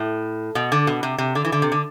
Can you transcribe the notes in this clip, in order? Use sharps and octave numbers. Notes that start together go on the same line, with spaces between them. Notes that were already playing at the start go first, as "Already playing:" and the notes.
Already playing: A2
B2
D3
B2
C3
C3
D3
E3
D3
C3
D3